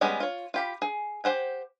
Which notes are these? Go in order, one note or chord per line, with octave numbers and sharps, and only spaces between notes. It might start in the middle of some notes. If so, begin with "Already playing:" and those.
G3 G#3 B3 C#4 G#4
F4 C#5
F4 G4 B5
G#4
G4 C5 F#5 G#5